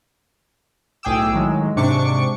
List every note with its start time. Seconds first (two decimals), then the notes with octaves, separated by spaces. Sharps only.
1.03 B1 A2 G#4 G5 D6 E6
1.32 A2 D#3 F#3 G#3
1.76 G#2 C3 D4 C#6 D6 C#7